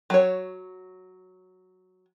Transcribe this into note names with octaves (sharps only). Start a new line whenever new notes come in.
F#3 C#5